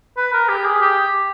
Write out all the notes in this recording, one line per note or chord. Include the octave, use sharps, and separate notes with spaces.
B4
A#4
G4
G#4
G4